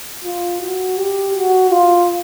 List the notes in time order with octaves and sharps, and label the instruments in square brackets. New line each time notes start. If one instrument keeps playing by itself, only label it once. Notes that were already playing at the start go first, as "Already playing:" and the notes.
[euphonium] F4
F#4
G4
F#4
F4